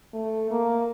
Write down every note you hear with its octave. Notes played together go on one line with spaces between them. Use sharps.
A3
A#3